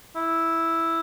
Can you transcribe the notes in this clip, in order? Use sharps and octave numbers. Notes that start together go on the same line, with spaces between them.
E4